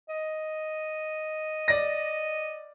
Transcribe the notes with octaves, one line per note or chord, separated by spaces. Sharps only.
D#5
D5 A#6